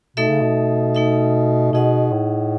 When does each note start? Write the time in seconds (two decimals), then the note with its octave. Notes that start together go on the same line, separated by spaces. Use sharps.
0.16 B2 A3 D#4 A4 E5
0.28 C#3
0.41 B2
0.95 A3 D#4 A4 E5
1.73 B2 D#4 G#4 D#5 F#5
2.12 A2